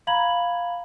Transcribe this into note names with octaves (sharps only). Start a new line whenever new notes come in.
F5 A#5 B5 G#6 F#7